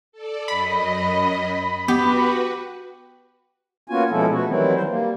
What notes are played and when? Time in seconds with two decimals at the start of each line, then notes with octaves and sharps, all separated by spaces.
0.12 A4 D5
0.48 F#2 D#5 B5
1.88 B3 F#4 G4 B4
3.90 A#3 B3 C#4 F4 F#4 G#5
4.11 B2 F3 G#3 C#4 E4 A4
4.31 A3 B3 F#4
4.47 D#3 E3 F#3 G3 C4 E4
4.74 E3 C5
4.88 G3 A#3